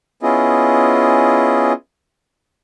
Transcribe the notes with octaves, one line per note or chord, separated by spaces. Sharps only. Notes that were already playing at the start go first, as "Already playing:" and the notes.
B3 C#4 E4 F4 G#4 D#5